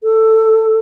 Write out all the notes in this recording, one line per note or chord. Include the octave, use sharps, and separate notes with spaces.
A4